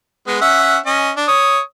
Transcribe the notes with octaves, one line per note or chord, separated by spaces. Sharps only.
G#3 B3
C#4 E5 F#5
C#4 D#5
D4
C#5 D#6